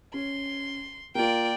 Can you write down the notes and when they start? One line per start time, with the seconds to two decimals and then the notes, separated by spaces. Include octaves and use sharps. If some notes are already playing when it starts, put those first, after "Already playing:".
0.14 C#4 C6
1.15 A#3 F4 D5 G5